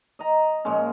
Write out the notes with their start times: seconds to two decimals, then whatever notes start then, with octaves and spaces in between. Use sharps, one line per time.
0.19 D#5 A#5
0.65 A#2 F3 G#3 C#4